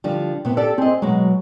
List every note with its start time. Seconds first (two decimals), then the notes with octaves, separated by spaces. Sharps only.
0.04 D3 F3 G3
0.45 C3 B3
0.57 G4 A4 D5
0.78 C4 G#4 D#5
1.02 B2 F#3 G#3